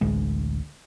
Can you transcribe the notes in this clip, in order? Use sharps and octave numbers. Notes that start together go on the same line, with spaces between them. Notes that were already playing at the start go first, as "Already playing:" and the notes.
A1 D2 G#3